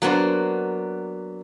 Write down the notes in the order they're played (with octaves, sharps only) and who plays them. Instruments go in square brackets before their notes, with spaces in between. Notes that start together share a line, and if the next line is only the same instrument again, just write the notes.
[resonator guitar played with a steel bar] F#3 A#3 B3 D4 C5